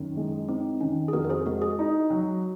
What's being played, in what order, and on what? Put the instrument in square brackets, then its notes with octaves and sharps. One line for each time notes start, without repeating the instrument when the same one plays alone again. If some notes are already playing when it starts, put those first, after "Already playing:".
Already playing: [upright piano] F#2 D#3
G#3
[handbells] C4 [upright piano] D#4
[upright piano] D#3 [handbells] C#4
[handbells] G#4
[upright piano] F2 [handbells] F#4 A#4
[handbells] A#4
G#4 C5
[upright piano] G#3 [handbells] F#4 A#4
[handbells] G#4
[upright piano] D#4
F#3